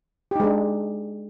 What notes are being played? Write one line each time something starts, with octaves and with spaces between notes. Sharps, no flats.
G#3 D4 D#4 G4